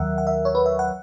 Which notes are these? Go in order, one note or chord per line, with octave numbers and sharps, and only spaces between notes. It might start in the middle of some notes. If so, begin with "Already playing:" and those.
Already playing: D#2 D#3 F#3 A#4 E5 F#5
F#5
E5
C#5
B4
E5
F#5